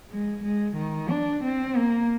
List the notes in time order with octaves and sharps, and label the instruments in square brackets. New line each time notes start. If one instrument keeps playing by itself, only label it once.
[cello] G#3
G#3
D#3
D4
C4
A#3